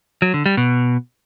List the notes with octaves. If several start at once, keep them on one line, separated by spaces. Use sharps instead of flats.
F#3
D3
G3
B2